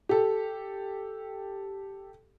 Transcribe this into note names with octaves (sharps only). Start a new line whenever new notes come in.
G4 A4